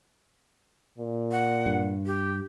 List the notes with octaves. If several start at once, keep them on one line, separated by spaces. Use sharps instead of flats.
A#2
F#5
G2
G4